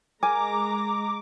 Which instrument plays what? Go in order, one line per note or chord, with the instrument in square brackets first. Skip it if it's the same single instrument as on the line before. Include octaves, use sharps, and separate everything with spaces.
[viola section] G#3 A#5 [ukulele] A#4 G#5 [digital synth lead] D6